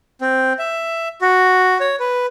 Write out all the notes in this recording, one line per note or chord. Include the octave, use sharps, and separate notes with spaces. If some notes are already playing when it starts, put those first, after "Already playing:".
C4
E5
F#4
C#5
B4